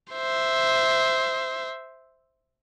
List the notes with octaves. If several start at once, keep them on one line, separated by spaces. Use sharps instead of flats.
C5 E5